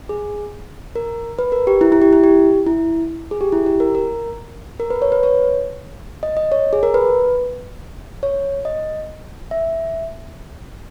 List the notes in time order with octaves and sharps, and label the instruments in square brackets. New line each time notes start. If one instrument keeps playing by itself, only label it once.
[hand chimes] G#4
A#4
B4
A#4
G4
E4
E4
G4
E4
G4
E4
G#4
G4
E4
G4
A#4
A#4
A#4
B4
C#5
B4
C#5
D#5
D#5
C#5
G#4
A#4
B4
C#5
D#5
E5